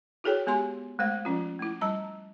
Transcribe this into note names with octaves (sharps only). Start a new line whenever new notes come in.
E4 F#4 G#4 A4 C#5 G5
G#3 B3 G4 G#5 C6
G#3 A3 C5 F5
F3 C#4 F4
A3 E4
G3 A5 A#5